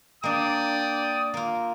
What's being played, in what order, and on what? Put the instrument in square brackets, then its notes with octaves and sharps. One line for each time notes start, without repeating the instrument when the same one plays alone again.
[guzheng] A#3 D4 [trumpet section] D5 G5 D#6
[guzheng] A#3 F4